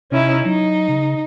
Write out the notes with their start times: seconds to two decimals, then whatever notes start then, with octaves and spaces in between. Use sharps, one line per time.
0.11 C3 C#4 D#4 E4
0.45 F#3 D#4
0.88 C#3